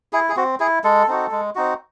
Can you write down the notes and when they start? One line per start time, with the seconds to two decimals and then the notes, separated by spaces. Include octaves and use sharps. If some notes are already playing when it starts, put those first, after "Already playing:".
0.13 E4 G#4
0.29 G#4
0.37 C4 F#4
0.60 E4 G#4
0.84 G#3 A4
1.08 C4 D#4 F#4
1.31 G#3
1.55 C4 D#4 F#4